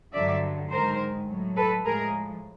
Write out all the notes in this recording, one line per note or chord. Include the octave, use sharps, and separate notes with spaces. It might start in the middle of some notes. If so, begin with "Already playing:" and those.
G2 D3 F#3 D5 E5
G#2 D#3 G#3 A#4 C5
A2 F#3
A4 B4
A2 F3 G#3 G#4 A#4